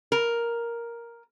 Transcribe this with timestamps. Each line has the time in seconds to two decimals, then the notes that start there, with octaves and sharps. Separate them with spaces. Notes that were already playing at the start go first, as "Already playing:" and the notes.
0.12 A#4